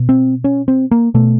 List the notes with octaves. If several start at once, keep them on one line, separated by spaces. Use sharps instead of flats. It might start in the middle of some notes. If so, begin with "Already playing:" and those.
Already playing: B2
C4
C#4
C4
A#3
B2 A3